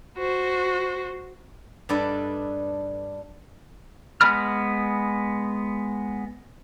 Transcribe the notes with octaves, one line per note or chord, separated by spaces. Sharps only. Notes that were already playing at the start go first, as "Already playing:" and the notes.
F#4 C5
G2 D4 A4 B4 D5 D#5
G#3 B3 B5 F6